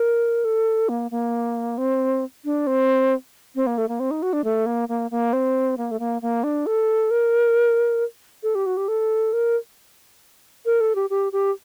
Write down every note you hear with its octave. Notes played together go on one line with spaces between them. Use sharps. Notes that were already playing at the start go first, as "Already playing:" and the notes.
Already playing: A#4
A4
A#3
A#3
C4
D4
C4
C4
A#3
A3
A#3
C4
D#4
F#4
D4
A3
A#3
A#3
A#3
C4
A#3
A3
A#3
A#3
D4
A4
A#4
A4
G4
F#4
G4
A4
A#4
A#4
A4
G4
G4
G4